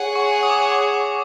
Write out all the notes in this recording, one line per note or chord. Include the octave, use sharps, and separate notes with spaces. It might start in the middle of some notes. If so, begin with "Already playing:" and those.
Already playing: G#4 C#5 F#5
C#6
D#6
D6
C#6
D6